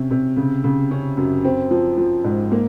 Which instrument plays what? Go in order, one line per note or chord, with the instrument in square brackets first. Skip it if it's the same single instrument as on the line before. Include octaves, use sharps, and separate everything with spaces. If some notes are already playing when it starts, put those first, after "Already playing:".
Already playing: [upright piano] C3 C#4
C3
C#3
C#3
C#4
F#2
C4
F3
F3
G#2
A#3